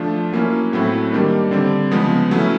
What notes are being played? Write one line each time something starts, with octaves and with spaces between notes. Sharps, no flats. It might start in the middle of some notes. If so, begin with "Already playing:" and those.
Already playing: F3 A3 D4 F4
F#3 A#3 C#4 E4
A2 F#3 A3 C4 E4
D#3 G3 A#3 D4
D3 G3 C4
C#3 F3 G#3 B3
F#3 A3 C#4 E4